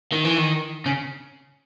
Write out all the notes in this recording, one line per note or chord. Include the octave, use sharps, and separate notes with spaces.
D#3
E3
D#3
C#3